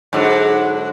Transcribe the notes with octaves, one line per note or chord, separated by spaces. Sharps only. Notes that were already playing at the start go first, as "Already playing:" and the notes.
G#2 D3 F#3